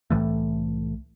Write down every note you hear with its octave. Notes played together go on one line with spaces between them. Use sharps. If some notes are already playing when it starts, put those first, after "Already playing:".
C2 A2 E3 A3